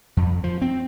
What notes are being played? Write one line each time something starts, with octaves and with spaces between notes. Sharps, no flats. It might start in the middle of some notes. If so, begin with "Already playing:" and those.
F2
F3
C4